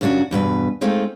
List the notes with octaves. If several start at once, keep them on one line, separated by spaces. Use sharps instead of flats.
F#2 C#3 D4 F4 F#4
E2 G2 B2 B4
G#3 A3 C4 D#4 F4